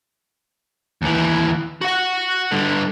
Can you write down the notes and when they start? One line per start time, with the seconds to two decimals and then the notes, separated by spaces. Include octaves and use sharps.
1.02 D#2 E3
1.82 F#4 F#5
2.51 G2 D3